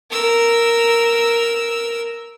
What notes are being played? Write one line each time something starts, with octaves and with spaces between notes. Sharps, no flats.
A#4 E6